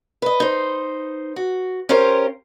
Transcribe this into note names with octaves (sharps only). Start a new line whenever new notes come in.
B4 D#5
D#4 C5
F#4
C#4 F4 G4 A#4 C5 C#5